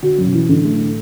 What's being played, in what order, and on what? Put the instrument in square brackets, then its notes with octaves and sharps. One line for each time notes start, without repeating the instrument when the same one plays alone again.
[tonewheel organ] D3 [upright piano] F#4
[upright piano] F#2
[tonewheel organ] B2
[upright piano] E3
[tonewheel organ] A2 [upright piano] D3
[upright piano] A3